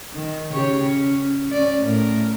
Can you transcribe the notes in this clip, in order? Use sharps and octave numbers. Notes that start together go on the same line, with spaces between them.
D#3
C#3 G4 C#5
C#4
C#4 D5
A2 A#4